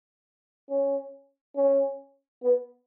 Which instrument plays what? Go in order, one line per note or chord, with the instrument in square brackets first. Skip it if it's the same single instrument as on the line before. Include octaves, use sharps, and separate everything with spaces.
[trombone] C#4
C#4
B3